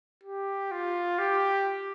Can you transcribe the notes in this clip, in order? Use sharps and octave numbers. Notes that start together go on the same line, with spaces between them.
G4
F4
G4